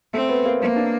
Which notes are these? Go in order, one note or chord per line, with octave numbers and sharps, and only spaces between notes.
A3 C4
B3
A#3
A#3 C4
D4